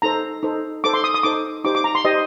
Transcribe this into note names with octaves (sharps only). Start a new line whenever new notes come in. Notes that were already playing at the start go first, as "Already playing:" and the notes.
D#4 A4 C5 A#5
D#4 A4 C5
D#4 A4 C5 D6
C6
D#6
D#6
D#4 A4 C5 D6
D#4 G4 C5 D6
D6
A#5
C6
D#4 G4 C5 D#5